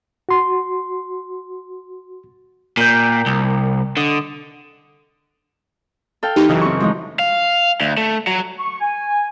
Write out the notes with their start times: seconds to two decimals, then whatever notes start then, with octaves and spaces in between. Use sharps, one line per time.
0.29 F#4 C6
2.77 A#2 A#4 D5 G5
3.26 C2
3.97 D3 D#5
6.23 A4 F5 G5
6.36 E3 D#4 G4
6.49 F#2 C#3 E3 D#4
6.62 C4 C#6
6.80 F3 G#3 D#4
7.19 F5
7.81 D2
7.97 A3
8.27 F#3
8.59 C#6
8.80 G#5